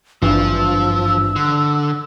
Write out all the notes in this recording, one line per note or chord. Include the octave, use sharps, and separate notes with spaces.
G#1 G2 E3 F3 E6
D3